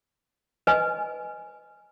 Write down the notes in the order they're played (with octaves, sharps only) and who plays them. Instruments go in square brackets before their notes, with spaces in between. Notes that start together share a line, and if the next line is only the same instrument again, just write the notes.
[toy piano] B4 D#5 G#5